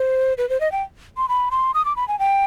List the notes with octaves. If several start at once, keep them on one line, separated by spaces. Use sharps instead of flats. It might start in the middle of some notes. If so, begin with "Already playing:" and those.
Already playing: C5
B4
C5
D#5
G5
C6
B5
C6
D#6
D6
B5
G#5
G5